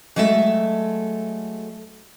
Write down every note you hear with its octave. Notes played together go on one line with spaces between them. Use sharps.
F#3 G#3 A3 A4 E5